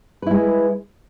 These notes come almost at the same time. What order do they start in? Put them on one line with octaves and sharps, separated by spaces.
B4 E4 G#3